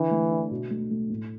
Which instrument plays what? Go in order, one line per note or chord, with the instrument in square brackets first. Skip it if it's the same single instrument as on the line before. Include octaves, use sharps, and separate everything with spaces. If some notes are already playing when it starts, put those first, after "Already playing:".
Already playing: [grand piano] D3 [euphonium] E3
[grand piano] A3
D4
B2
A3
A3
A2